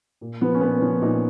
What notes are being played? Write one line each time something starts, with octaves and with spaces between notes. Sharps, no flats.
A#2
F3 B3
C#4
A#2 B3
F3 C#4
A#2 D#4